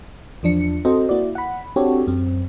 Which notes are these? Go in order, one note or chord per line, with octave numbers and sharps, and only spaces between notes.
E2 F3 D4 C#7
C4 F#4 A4 C5 D#5
A#3 E4 F#4 D5
F#5 B5
C4 D4 F#4 G4 A4 C#5
F#2 C4